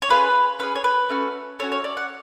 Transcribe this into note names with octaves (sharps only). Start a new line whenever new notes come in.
C#5
C#4 F4 G#4 B4
C#4 F4 G#4 B4
C#5
B4
A3 C#4 F#4
A3 C#4 F#4 C#5
C#5
D5
F#5